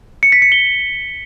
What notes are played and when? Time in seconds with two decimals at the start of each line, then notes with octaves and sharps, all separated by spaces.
0.23 C#7
0.32 B6
0.42 C#7
0.52 G7